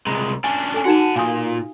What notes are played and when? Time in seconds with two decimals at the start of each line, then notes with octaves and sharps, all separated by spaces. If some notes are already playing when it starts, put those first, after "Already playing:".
0.07 C2 G#3 A#5
0.44 C#4 D4 G#5
0.74 A4 G#5
0.85 D#4 F#4 F#5 A5
1.16 A#2 F5 G#5 D#6